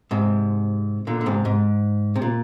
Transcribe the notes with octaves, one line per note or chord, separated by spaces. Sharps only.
G#2 C3
A#2 D3
D3
G#2 C3
G#2
C3
A#2